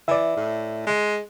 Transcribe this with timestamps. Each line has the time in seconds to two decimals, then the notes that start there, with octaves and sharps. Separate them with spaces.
0.08 E3 D5 E5
0.37 A2
0.87 G#3